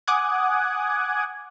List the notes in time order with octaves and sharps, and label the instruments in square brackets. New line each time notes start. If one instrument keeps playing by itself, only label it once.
[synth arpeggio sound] F#5 G#5 D6 D#6 F#6 G#6